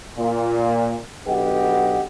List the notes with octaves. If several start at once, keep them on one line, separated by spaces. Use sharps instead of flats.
A#2
B1 D3 G4 B4 D#5 F#5